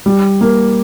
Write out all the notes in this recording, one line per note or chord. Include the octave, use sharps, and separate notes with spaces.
G3
A#3